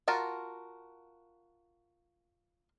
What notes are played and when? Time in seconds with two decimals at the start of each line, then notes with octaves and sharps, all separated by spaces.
0.08 F4 F#4 A#4 A5